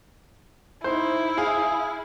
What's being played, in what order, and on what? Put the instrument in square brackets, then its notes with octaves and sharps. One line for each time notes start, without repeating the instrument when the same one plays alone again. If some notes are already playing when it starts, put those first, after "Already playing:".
[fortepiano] D#4 C5 [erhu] E4
[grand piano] G#4 [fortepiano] F5